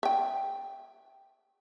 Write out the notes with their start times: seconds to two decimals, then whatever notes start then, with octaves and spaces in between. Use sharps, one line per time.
0.03 E5 G5